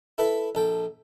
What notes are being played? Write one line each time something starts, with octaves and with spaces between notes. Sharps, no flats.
E4 A4 B4 E5
A#1 A4 G5